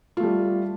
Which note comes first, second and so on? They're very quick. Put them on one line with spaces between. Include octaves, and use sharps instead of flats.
F4 A3 G3